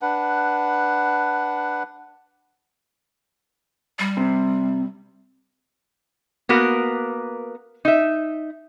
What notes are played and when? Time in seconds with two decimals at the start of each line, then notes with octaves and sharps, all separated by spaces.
0.02 D4 B4 F#5
3.99 G3
4.17 C3
6.49 A#3 B3 F#4 A#4
7.85 D#4 E5